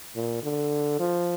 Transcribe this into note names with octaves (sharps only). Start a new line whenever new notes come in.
A#2
D3
F3